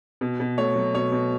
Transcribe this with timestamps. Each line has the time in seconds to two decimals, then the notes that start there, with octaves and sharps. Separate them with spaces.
0.21 B2
0.40 B2
0.58 A3 C#5
0.76 F#3
0.94 B2 C#5
1.12 B2